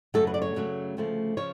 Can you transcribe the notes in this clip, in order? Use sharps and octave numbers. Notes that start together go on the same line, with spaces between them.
F#2 C#3 F#3 A3 A4
B4
D5
C#5
F#2 C#3 F#3 A3
D2 C#3 F3 A3
C#3 F3 C#5